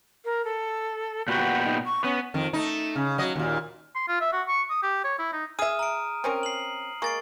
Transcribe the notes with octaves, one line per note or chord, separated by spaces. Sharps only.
A#4
A4
A#2 B3 F#4 G4
D#4
C#6
B3 C#4
F2 D#3
A3 D#4
C#3
F#3 D#5
D#2 A#2
C6
F4
E5
F#4
C#6
D#6
G4
C#5
E4
D#4
G#4 E5 D#6 F6 D#7
A#5 D7
C4 C#4 A#4
C7 F#7
G#3 A#3 C#6 A6 D7